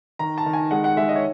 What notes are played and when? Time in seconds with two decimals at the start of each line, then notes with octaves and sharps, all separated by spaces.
0.19 D#3 A#5
0.38 A5
0.46 D#3
0.53 G#5
0.71 G#3 F#5
0.84 F#5
0.97 G#3 E5
1.09 D#5
1.15 C#5